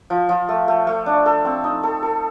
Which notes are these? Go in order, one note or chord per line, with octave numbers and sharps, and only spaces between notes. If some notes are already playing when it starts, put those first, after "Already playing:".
F3
F3
A3
A3
A3
D4
A4
C4
D#4
A4
A4